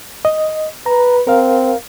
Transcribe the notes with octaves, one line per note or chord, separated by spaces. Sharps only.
D#5
B4 A#5
C4 A#4 F5